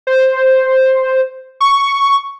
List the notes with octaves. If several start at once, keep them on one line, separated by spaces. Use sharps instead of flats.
C5
C#6